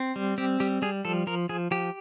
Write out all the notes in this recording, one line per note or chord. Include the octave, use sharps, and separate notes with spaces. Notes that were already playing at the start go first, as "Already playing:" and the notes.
Already playing: C4
G3
C4 G4
G3 G4
G3 G#4
F3 A4
F3 A#4
F3 G#4
F3 G4